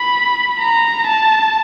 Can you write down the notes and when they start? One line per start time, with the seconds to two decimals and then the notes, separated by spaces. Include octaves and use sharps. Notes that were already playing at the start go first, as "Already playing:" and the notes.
Already playing: B5
0.60 A#5
1.07 A5